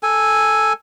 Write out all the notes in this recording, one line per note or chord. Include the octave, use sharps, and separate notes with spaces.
A4 G#5